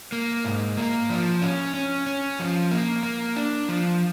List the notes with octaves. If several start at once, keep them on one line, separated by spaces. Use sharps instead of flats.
A#3
G#2
A#3
F3
C#4
C#4
C#4
F3
A#3
A#3
D4
F3